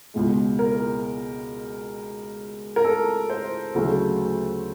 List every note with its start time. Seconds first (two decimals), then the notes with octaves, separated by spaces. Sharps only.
0.14 C#2 B2 G#3
0.59 A#4
2.76 A#4
2.85 A4
3.30 C5
3.74 D2 C#3 F#3 A3